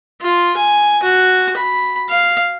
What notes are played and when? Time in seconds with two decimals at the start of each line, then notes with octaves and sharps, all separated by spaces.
0.22 F4
0.57 G#5
1.03 F#4
1.57 B5
2.10 F5